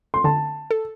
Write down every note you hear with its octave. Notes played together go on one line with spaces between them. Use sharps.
C6
D3 A5
A4